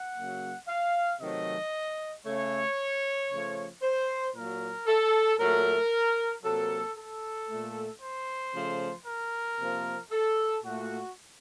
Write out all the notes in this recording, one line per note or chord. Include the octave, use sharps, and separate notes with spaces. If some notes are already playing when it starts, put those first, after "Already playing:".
Already playing: F#5
C#3 F#3 A#3
F5
C3 D#3 F#3 A3 D#5
C#3 A3 C#5
C#3 F3 A3
C5
A#2 F#3 A#3 A#4
A4
A#2 F#3 A3 A#4
C3 F#3 A#3 A4
A4
A#2 A3
C5
C#3 F3 A3
A#4
C3 F3 A#3
A4
A#2 A3 F#4